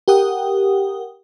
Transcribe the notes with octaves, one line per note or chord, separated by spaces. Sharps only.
G4 A#4 F#5 G5 D#6